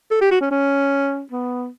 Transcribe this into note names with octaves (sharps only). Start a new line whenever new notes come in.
A4
G4
F#4
C#4
C#4
B3